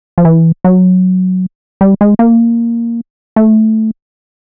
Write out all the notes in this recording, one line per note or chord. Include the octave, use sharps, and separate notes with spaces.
F3
E3
F#3
G3
G#3
A#3
A3